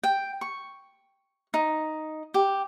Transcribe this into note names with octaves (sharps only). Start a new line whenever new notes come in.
G5
C#6
D#4
G4